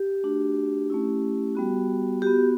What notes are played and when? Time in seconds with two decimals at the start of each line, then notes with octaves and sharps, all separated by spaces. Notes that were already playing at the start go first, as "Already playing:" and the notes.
Already playing: G4
0.23 A3 D4 F#4
0.90 A3 C#4 E4
1.55 G3 B3 F#4
2.22 B3 F#4 G4